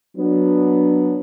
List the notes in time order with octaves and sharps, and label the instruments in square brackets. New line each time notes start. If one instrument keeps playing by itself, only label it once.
[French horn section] F#3 B3 D4